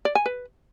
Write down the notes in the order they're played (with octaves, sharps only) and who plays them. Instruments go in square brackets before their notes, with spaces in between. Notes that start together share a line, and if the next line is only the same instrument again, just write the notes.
[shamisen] D5
G#5
B4